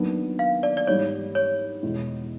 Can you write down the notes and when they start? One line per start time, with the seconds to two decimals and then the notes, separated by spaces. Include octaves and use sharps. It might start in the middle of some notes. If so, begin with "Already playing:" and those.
Already playing: D#2 D#3 F#3 B3 D4
0.39 F5
0.63 D5
0.77 D5
0.87 G#2 E3 G3 C#5
1.35 C#5
1.83 E2 B2 G#3